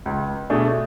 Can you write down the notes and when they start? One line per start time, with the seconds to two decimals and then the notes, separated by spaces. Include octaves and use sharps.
0.06 C#2
0.50 B2 A3 D4 G#4